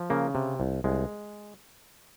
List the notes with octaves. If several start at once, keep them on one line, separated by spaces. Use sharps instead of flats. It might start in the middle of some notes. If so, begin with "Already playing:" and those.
Already playing: F3
C#3 A#3
C3
C2
C2 G#3